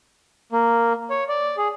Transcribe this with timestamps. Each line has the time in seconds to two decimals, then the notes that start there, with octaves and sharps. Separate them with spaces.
0.52 A#3
1.10 C#5
1.29 D5
1.57 G#4